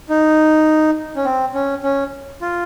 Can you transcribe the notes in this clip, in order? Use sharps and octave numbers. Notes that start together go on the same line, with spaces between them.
D#4
C#4
C4
C#4
C#4
F4